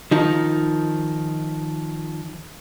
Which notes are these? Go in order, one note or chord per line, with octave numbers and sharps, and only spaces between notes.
D#3 F3 D#4